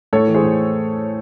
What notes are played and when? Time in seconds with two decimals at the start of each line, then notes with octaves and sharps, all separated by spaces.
0.13 A2 A4 C#5
0.27 E3
0.34 G#4 C5
0.42 A2